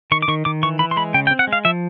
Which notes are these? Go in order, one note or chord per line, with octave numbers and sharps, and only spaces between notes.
D#3 C#6
D6
D#3 C#6
D#3 D6
E3 C#6
E3 B5
C6
G#3 B5
C#3 G5
G5
C4
F#5
G#3
F5
F3 E5